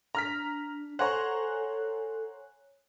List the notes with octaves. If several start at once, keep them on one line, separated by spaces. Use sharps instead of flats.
D4 A#5 F6 B6
A4 C5 C#5 F#5 G#5 A#5 F#6